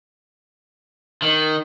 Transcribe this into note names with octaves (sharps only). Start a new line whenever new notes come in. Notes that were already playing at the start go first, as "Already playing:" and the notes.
D#3